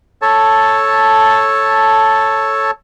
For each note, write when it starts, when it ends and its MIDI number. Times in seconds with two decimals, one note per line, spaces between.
0.22 2.71 69
0.22 2.71 73
0.22 2.71 81